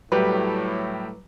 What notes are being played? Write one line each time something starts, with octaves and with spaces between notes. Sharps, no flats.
A2 F#3 G3 G4 B4